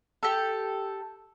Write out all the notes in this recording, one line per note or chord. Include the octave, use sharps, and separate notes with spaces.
G4 A4